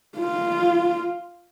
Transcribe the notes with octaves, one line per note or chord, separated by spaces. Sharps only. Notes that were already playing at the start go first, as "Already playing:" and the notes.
F4